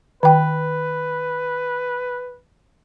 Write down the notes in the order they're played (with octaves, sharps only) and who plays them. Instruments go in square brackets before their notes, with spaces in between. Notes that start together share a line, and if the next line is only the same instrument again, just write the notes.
[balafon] D#3 G5 [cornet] B4